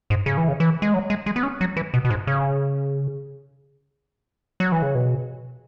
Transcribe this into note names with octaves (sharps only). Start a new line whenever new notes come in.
G#2
C#3
E3
C#3
E3
G#3
F#3
G#3
G#3
B3
C#4
F#3
E3
B2
B2
G#2
C#3
F#3
E3
C#3
B2